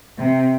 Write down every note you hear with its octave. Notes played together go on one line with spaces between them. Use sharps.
C3